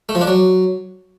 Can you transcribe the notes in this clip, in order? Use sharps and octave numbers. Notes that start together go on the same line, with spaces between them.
A3
F3
D4
F#3